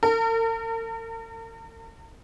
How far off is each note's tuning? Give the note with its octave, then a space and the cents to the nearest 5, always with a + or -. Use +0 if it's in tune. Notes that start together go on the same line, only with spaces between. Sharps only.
A#4 -45